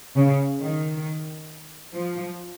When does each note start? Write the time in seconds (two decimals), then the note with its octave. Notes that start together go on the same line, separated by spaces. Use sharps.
0.16 C#3
0.61 D#3
1.94 F3